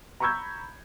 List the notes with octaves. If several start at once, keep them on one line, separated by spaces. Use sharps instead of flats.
A#5 B5 C#6 E6 G6 G#6